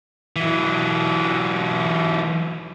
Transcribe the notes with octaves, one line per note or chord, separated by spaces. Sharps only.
E3 F#3